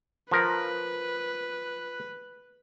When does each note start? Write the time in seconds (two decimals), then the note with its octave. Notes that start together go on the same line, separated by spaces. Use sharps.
0.31 F3 A#4 B4